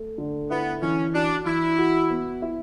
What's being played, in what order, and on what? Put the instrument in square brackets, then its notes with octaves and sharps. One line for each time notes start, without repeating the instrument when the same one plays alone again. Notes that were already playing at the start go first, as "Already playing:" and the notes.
Already playing: [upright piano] A3
D3
[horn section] B3 [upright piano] E4
[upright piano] E3 [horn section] C#4
[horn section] D4 [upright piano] F#4
[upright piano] E3 [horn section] E4
[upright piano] F#4
B3
E4